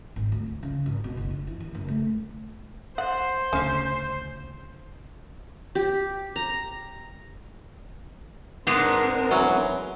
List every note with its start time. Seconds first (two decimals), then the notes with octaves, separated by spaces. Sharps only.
0.16 G#1
0.32 D2
0.46 A#2
0.63 C#3
0.86 G#1
1.04 B2
1.17 F#1
1.31 D4
1.47 E3
1.60 D#2
1.75 F#1
1.88 A3
2.98 C5 F#5
3.53 D2 C#3 C#4
5.75 G4
6.36 A#5
8.67 G#2 G#3 B3 C4 D4 A#4
9.31 E3 F#3 C#4